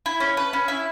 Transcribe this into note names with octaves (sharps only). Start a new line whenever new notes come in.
E4
C#4
B4
C#4
E4